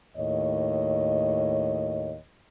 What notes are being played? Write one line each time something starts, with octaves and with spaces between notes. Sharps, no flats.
D#2 A2 C#5 D#5